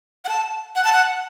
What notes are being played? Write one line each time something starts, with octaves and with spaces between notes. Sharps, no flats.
F#5
A5
F#5
A5
F#5